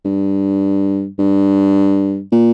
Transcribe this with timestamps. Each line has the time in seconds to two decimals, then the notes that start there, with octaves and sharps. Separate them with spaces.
0.05 G2
1.19 G2
2.32 A#2